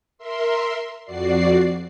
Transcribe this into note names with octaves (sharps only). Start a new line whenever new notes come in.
A#4 E5 C6
F2 F#4 D5 C7